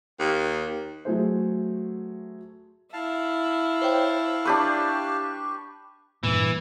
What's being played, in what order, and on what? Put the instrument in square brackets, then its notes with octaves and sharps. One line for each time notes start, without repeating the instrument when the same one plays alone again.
[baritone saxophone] D#2
[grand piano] F#3 A3 G#4 C5
[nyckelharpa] E4 [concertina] F5 A5
[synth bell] C5 C#5 G5
[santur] D4 G4 B4 [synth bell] C#6
[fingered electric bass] G2 A#2 [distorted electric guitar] E3